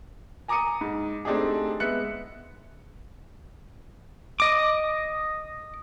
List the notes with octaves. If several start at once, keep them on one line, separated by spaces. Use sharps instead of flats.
G#5 A#5 D6 D#6 C#7 D#7
G#2
A3 C4 D4 D#4 G4 G#4
G#3 B3 E5 F#6 C#7
D#5 D6